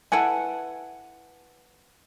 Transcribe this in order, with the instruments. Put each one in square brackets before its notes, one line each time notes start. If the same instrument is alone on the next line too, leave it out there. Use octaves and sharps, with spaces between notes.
[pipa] E4 A4 G#5 [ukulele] B4 F#5 A5